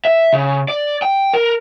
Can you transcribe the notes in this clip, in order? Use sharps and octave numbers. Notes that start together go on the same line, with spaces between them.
E5
C#3
D5
G5
A#4